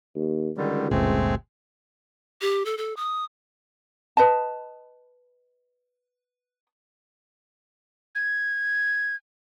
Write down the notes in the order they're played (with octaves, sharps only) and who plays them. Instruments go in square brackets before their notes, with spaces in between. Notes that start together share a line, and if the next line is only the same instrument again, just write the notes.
[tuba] D#2
[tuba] C#2 [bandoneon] D3 D#3 G3
[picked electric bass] G1 D2 A#2 [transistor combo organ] G#3 [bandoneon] A3 C4
[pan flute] G4
A4
A4
D#6
[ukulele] B4 D#5 A5
[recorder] G#6